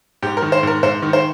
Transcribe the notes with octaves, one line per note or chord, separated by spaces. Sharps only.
G#2 G4
A#4
D#3
C5
G#2 A#4
G#2 C5
D#3
C5